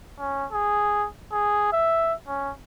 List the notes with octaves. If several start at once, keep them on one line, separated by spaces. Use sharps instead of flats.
C#4
G#4
G#4
E5
C#4